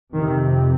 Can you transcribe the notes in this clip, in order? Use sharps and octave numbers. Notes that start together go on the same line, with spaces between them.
F2 C3 D#3